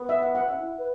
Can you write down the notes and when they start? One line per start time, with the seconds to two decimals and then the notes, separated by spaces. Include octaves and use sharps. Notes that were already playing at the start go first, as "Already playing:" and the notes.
Already playing: B3
0.09 E5
0.22 F#5
0.35 F#5
0.48 C#4 E5
0.58 E4
0.78 B4